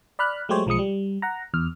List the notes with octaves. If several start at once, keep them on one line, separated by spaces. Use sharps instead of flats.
D5 B5 F6 F#6
F#3 G#3 A3 G4 C5 C#5
B1 F3 G#3 D#6 C#7
G3
F#5 A#5
E2 F6